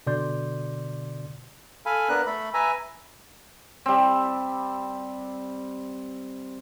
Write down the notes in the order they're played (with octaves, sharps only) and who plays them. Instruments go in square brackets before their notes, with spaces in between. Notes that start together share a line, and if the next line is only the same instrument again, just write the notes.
[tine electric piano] B2 D3 D5 C6 G6
[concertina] A4 F5 G#5 B5
B3 D4 A#4 F#6
A3 A4 B5
B4 E5 G#5 A#5
[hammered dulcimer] G3 C4